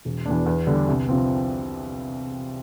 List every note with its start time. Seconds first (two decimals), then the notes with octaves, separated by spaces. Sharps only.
0.05 E1
0.26 E2 B2 B3 D4
0.46 E2
0.67 D3 G3 B3 D4
0.88 C2
1.09 C3 F3 C4